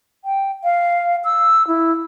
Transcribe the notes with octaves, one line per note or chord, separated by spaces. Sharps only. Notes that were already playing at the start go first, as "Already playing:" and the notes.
G5
F5
E6
E4